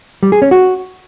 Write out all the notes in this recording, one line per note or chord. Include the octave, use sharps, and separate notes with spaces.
G3
G#4
C#4
F#4